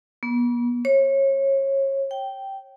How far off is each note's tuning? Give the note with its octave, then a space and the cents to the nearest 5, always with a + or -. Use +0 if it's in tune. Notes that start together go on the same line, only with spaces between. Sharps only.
B3 -40
C#5 -30
G5 -10